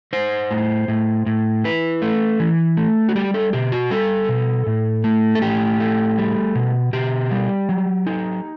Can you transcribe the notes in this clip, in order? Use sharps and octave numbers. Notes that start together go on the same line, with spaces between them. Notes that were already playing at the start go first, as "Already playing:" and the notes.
D#4 C5
A2
A2
A2
E4 B4
A3
E3
A3
F#4
G3 G4
A4
B2 G4
F#4
G3 A4
B2
A2
A3
A4
A2 G4
A3
G3
B2
B2 G4
G3
F#3
D#4